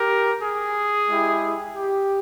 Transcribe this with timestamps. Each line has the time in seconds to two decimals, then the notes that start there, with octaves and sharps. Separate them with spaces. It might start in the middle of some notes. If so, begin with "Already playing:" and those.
Already playing: G4 A#4
0.40 G#4
1.08 G#3 E4 G4
1.75 G4